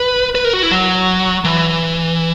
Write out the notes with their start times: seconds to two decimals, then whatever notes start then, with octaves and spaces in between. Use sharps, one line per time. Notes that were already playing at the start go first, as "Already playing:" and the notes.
Already playing: B4
0.35 B4
0.45 A#4
0.53 F#4
0.63 E4
0.71 F#3
1.45 E3